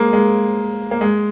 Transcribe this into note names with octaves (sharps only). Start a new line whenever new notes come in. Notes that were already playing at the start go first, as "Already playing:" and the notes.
Already playing: G#3 A#3
G#3
A#3
G#3